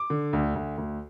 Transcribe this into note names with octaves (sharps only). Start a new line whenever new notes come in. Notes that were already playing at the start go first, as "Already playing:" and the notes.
Already playing: D6
D3
D2
D2
D2